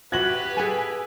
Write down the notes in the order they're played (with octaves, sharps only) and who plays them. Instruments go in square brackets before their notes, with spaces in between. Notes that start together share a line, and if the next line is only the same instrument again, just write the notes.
[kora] F#4 E5 F#5 [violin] G4 B4 [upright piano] G#6 A#6 F#7
[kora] G#4 A4 [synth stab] G#5